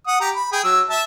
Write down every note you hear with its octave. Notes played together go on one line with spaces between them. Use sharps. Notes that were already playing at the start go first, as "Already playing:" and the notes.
F#5 D#6
G4 A#5
B5
G#4 G5
F#3 E6
E5 A5